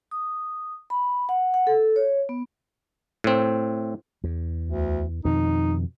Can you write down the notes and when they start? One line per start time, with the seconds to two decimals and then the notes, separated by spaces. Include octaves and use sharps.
0.11 D#6
0.90 B5
1.29 F#5
1.54 F#5
1.67 A4
1.96 C#5
2.29 B3
3.24 A2 C4
4.24 E2
4.65 D2
5.25 F2 B2 D#3 D#4